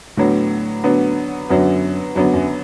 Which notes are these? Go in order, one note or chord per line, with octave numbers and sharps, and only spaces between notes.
A2 D3 F#3 B3
D3 F#3 B3
F#2 D3 F#3 B3
F#2 D3 F#3 B3
F#2